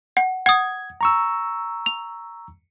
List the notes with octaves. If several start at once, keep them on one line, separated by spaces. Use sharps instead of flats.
F#5
F#5 D#6 G#6
A#5 C#6 E6
F7